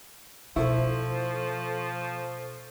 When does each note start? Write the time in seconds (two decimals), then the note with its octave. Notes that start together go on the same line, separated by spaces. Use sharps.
0.56 B2 F3 E4 A4 C5 C#6